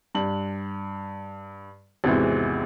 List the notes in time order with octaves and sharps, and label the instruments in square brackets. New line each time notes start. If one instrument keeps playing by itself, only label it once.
[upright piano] G2 F#7
G#1 E2 C3 E3 G#3